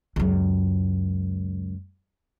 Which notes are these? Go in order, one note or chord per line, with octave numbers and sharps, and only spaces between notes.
C#2 F#2